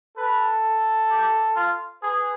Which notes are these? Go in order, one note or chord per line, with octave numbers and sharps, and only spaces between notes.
A4 B4
G4
F4
G#4 B4